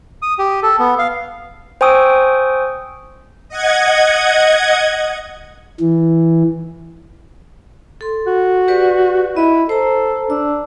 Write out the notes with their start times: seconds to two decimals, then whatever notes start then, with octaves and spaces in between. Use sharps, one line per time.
0.22 D#6
0.39 G4
0.63 A4
0.79 B3
0.99 F5
1.81 C5 G5 G#5 C#6 D#6 E6
3.49 D#5 F#5 G#6
5.80 E3
8.01 A4 C6
8.27 F#4
8.68 G4 B4 D5
9.37 E4 D#5
9.69 A4 C5 A#5
10.30 D4 E6